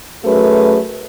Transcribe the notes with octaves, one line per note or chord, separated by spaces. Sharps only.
F#2 F#3 A3 G#4 B4